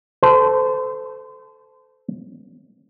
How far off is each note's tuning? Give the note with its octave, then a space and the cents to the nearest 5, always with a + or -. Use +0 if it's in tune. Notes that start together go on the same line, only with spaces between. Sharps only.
A4 -10 C5 -30